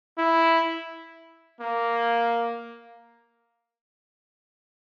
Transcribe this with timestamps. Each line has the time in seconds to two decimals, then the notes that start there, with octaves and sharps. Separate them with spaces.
0.18 E4
1.61 A#3